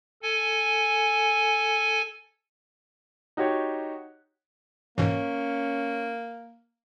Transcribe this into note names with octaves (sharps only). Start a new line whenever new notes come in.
A4 G#5
D#4 F#4 G4 C#5
G#2 B2 E3 A#3 C#4